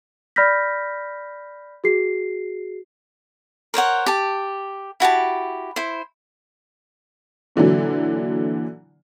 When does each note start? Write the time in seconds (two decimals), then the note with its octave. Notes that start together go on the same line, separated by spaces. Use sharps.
0.36 D5 B5 F6 G6 A#6 B6
1.84 F#4 G#4 C7
3.74 A#4 C5 C#5 F#5
4.06 G4 A5
5.00 E4 F#4 G4 A5
5.76 E4 C5
7.56 A#2 D3 E3 F#3